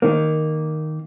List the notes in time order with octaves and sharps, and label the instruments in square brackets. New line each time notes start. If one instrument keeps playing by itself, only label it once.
[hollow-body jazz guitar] D#3 A#3